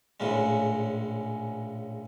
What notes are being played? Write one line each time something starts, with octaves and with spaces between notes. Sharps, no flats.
A#1 A2 C#3 G#3